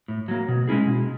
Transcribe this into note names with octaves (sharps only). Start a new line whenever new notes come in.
A2
F#3 A#3
B2
G#3 C#4 E4 G#4
B2